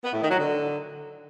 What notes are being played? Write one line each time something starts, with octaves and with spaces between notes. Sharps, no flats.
B3
A2
D#3
F#3
D3